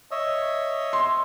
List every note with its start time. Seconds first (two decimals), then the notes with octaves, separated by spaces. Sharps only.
0.11 C#5 D#5 E5
0.93 C6